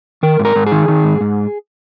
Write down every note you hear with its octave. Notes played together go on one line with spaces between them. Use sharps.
D#3 A#4
G#2
A#4
G#2
G#4
D#3
D#3
G#2
G#2